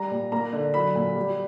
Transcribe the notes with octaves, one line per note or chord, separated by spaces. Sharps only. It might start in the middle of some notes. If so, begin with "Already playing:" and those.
Already playing: G3 A#5
A#2
A#3 A#5
D3
F#3 B5
A#2
G3